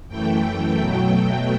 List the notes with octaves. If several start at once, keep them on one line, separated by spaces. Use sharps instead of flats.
F#2 E3 A3 G5
B2 F#3 A3